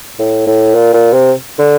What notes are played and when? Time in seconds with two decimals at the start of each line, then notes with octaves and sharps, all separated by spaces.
0.19 A2
0.46 A2
0.74 A#2
0.93 A#2
1.13 C3
1.59 D3